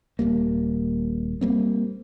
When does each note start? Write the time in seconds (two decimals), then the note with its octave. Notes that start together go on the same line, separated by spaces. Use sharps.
0.19 D#1 C#2 G3 A#3
1.41 G3 A#3 C4